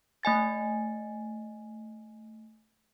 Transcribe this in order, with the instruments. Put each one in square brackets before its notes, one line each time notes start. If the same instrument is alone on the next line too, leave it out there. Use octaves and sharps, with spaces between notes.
[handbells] A3 D#5 G#5 A6